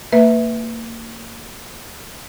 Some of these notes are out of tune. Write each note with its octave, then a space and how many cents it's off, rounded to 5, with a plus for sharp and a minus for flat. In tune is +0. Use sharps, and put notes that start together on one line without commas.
A#3 -30 B4 +0 E5 +0